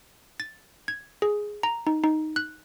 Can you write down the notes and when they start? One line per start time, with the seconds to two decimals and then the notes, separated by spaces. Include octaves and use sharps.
0.40 A6
0.88 G#6
1.22 G#4
1.63 A#5
1.87 D#4
2.04 D#4
2.36 F#6